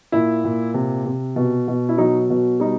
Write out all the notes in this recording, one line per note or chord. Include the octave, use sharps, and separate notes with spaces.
A#2 E4
A#2
C3
C3
B2
B2
E4
F#3 D#4
B2
G3 D#4